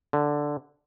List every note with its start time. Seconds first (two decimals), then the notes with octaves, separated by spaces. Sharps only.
0.13 D3